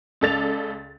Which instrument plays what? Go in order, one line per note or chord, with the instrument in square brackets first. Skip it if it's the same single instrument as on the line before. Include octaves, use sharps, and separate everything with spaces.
[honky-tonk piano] C#2 C#3 A4 D5 A6 F7